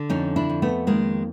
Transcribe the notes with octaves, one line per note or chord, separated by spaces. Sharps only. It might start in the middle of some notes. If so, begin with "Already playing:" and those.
Already playing: D3
F2 C#4 D#4
D4 E4
F2
A3 B3
D#3 G#3 A#3